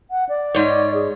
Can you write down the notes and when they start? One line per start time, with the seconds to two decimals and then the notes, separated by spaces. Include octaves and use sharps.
0.11 F#5
0.29 D5
0.55 G#2 C#5
0.94 G#4